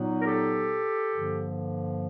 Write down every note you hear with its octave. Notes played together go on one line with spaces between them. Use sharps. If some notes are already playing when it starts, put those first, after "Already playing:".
Already playing: A#2 F#3 B3 D#4
A#4
G4 A4
G2 D3 F3 A#3